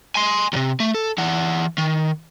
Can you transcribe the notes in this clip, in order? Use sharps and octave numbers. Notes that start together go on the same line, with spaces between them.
G#5 C6
D#2 C3
A3
A4
E3 F#5
D#3